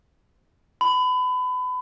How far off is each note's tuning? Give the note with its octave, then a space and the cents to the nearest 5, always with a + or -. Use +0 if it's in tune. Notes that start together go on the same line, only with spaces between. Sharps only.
B5 +30